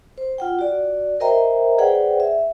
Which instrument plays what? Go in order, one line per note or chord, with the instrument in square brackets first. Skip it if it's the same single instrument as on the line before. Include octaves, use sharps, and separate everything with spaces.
[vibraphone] C5
F4 F#5 G5
F#4 D5
A#4 C5 D#5 E5 G5 A#5
G#4 B4 C5 D5 F#5 G5
E5